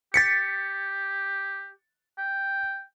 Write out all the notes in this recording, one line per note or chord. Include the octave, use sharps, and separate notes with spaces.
G4 A6 B6 C#7
G5